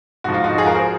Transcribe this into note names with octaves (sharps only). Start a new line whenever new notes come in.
G#2 F3 F#4
F4
D#4 F#4
F4 G#4
F#4 A#4
G#4 C5